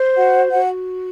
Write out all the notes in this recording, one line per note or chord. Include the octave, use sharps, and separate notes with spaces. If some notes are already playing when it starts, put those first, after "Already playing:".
Already playing: C5
F#4 F#5
F#4 F#5